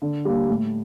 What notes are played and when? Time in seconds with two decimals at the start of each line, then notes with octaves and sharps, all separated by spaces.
0.02 D3
0.25 G3 A#3
0.49 A2